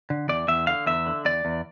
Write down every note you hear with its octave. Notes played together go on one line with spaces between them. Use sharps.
D3
E2 D5
E2 E5
D3 F5
E2 E5
D3
E2 D5
E2